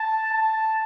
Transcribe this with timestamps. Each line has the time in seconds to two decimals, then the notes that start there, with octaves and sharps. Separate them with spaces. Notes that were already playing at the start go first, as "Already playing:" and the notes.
Already playing: A5
0.33 A5